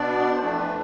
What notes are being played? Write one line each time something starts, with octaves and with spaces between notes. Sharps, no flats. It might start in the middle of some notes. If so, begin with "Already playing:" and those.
Already playing: B2 B3 D4 D5
C5
F2 E3 A3 D4 D5
B4